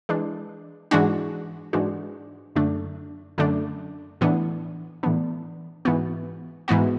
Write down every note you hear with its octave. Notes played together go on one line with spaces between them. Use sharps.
E3 G#3 D4
G#2 E3 G#3 D4 F#4
G#2 E3 G#3 D4 F#4
F#2 D3 A3 D4
F#2 D3 A3 D4
A2 E3 B3 D4
A2 E3 B3 D4
G#2 E3 B3 F#4
G#2 E3 B3 F#4